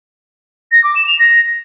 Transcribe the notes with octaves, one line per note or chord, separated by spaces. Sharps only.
A#6
D6
E7
F7
A#6